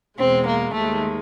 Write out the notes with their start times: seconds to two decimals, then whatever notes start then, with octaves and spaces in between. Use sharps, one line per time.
0.18 E2 B2 G#3 C4
0.47 A#3
0.75 D#2 D#3 G#3 A3